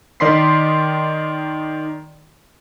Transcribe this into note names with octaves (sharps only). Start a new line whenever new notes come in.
D#3 D5 D#5 C6 B6 C7